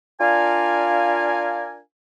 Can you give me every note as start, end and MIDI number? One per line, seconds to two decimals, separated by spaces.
0.21 1.79 62
0.21 1.79 65
0.21 1.79 70
0.21 1.79 74
0.21 1.79 77
0.21 1.79 80